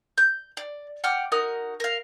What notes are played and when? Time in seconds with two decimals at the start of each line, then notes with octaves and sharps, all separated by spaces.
0.18 G6
0.57 D5
1.04 F#5 G5 D6 F6
1.32 D#4 F#4 A#4 D#6
1.80 A#4 F5